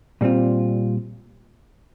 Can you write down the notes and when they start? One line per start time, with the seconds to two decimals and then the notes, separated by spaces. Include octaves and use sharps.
0.21 A#2 G3 C4 F4